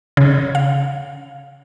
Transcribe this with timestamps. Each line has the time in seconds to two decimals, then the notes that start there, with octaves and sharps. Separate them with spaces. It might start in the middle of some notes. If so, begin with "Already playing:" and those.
0.17 C#3
0.55 F5